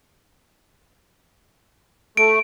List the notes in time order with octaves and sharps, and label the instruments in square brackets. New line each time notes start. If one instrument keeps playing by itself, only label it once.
[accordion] A3 [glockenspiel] D7